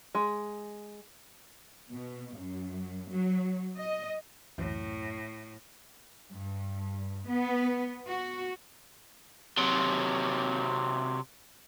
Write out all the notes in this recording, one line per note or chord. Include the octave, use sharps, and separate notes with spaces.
G#3
B2
F#2
F#3
D#5
C#2 F#2 A2 E3
G2
B3
F#4
C3 F#3